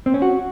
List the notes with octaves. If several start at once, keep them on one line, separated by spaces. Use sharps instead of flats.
C4
C#4
F#4